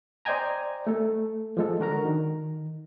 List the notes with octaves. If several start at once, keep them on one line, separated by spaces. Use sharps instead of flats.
C5 D5 D#5 G5 G#5 A#5
A3 A4
F3 G#3 A4
D3 F#4 A#4 A#5
D#3